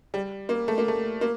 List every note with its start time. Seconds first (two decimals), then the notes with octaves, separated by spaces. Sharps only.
0.14 G3
0.49 A#3
0.68 A3
0.78 A#3
0.88 A3
1.21 A#3